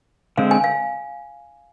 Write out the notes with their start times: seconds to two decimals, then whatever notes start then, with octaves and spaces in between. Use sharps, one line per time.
0.38 D3 G#3 C4 F5
0.51 G#5
0.64 F5